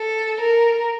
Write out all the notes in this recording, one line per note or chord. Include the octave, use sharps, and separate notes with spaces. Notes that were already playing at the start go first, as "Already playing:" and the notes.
Already playing: A4
A#4